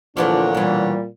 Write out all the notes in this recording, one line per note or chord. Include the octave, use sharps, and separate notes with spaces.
D2 A#2 D3 E3 F3 D4 C#5 F#5
B2 E3 G3